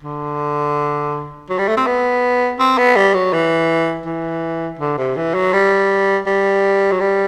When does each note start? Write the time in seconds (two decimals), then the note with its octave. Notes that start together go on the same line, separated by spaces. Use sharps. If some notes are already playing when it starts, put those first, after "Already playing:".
0.02 D3
1.49 F#3
1.58 G3
1.68 A3
1.77 C4
1.86 B3
2.59 C4
2.77 B3
2.96 G3
3.14 F#3
3.33 E3
4.05 E3
4.79 D3
4.98 C3
5.16 E3
5.34 F#3
5.53 G3
6.26 G3
6.91 F#3
7.00 G3